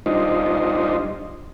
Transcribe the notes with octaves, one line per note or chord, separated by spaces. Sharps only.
G3 D4 D#4 F4 C5 D#5